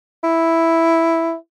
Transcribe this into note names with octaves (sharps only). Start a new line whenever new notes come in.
E4